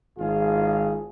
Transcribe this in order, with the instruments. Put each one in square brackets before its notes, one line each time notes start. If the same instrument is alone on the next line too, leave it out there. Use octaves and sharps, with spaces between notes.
[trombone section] G#1 F4 G#4